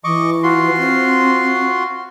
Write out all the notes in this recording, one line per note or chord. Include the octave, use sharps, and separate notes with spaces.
E3 D#5 C#6 D6
F4 F#4 C6
C4